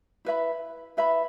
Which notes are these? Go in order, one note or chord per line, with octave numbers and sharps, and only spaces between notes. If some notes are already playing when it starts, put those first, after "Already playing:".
E4 B4 E5 B5
E4 B4 E5 B5